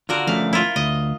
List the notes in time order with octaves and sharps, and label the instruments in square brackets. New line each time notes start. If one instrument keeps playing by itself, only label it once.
[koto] D3 F#4 A#4 [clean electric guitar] F4
[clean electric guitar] F3 A3 C#4 [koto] F5
[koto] E4 F4
[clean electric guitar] D2 [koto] D#5